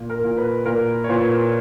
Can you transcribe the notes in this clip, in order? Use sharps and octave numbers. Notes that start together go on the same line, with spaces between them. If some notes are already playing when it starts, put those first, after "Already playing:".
Already playing: A#2
A#4
A#2
B4
A#2 A#4
C#5
A#2 B4